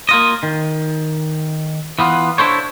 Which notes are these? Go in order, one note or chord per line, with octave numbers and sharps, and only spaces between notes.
A#3 F4 D#5
D#3
E3 B3 F4
D4 E4 A4 C5 C#5